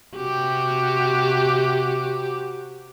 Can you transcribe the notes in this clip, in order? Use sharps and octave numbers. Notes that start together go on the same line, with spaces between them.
C3 F#4 G4